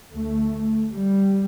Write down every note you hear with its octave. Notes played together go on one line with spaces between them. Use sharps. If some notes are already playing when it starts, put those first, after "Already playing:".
D2 A3
G3